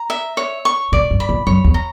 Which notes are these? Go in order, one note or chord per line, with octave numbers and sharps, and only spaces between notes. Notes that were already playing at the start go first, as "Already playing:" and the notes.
Already playing: A#5
E5
C#5
C#6
A#2 D5
G2
B5
A#2
F#2 C#5
E2
A#5